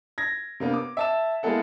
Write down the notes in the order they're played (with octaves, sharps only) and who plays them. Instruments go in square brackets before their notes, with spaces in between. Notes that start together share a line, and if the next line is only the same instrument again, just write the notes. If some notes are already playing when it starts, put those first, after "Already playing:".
[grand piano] G#6 A#6
C3 A#3 B3 D4
D6
E5 A5 E7
G#3 A#3 B3 E4 A4 F#5